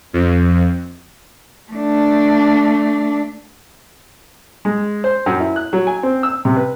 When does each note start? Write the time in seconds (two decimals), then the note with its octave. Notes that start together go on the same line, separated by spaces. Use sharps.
0.13 F2
1.72 A3 D4
4.65 G#3
5.04 C5
5.26 F#2
5.40 E4
5.56 F#6
5.73 F#3
5.87 G#5
6.03 C4
6.23 E6
6.45 C3
6.57 B4